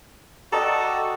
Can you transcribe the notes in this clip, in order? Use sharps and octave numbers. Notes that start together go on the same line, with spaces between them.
F#4 A4 D5 D#5 G5 A#5